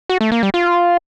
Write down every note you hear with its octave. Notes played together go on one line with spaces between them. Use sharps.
F#4
A3
A#3
G3
F4